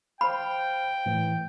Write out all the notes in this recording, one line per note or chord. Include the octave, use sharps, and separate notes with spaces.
C5 F5 G5 B5
A2 E3